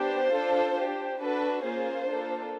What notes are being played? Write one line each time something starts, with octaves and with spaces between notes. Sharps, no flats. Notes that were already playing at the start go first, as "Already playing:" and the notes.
Already playing: B3 D4 G4 C5
D4 F4 A4
D4 G4
D4 F#4 A4 B4
A#3 C#4 F4 G#4 C5
A#3 D4 F4 A4